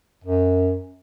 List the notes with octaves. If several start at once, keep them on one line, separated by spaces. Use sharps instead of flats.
F#2